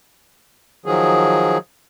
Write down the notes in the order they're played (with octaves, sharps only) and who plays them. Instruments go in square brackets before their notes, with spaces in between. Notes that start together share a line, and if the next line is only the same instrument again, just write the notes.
[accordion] D#3 F3 F#3 G#4